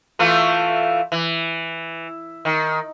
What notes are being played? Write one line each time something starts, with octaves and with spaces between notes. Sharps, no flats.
E3 A3 F4
E3
D#3